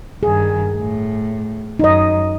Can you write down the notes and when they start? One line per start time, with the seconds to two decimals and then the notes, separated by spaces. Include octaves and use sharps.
0.23 G2 D#3 G#4
0.77 A2
1.79 F#2 D#4 D#5